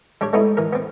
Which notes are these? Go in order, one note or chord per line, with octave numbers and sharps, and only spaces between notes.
G3 D4 G4 C#5
G#3 A3 B3 D#4 E4
E3 A#4
B3 C4